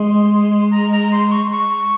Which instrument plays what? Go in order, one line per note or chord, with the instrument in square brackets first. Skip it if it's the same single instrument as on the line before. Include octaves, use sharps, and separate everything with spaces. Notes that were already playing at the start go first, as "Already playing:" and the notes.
Already playing: [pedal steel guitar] G#3 [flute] C6
[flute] A#5
A#5
C6
C#6
C#6